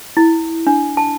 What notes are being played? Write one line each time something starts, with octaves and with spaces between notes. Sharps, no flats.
E4
D4
A5